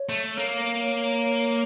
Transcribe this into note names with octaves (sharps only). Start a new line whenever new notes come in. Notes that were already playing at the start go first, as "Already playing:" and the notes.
Already playing: C#5
A3
A#3